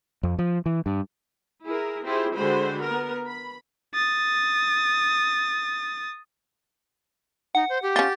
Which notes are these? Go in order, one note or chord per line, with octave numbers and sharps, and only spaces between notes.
F2
F3
E3
G2
E4 G#4 A#4
C4 E4 F4 G4 G#4 C5
D3 G#3 F#4 G4 C5 B5
B3 A#4
B5
D#6 A6
D#4 F#5
C5
G4
C#4 F4 A6